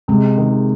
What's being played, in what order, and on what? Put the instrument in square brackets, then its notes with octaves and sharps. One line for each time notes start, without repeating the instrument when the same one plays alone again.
[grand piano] C3 [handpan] G#3
[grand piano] D#3